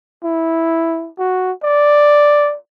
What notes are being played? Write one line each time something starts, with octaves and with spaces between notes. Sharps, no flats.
E4
F#4
D5